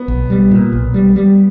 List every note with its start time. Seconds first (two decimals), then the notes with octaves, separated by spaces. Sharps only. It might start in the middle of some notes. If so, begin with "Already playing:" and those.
Already playing: B3
0.08 B1
0.30 G3
0.51 A#2
0.73 B1
0.94 G3
1.16 G3